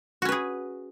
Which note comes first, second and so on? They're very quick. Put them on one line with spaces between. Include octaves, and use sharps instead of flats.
F#4 C#4 B4 G#4